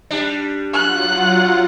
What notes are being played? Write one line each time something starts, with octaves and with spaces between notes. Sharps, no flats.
G3 D4
F#3 F4 F#5 F#6